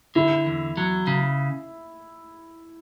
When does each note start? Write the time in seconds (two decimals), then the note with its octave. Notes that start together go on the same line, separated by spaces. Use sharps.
0.15 D3 E4
0.46 E2
0.77 F#3
1.07 C#3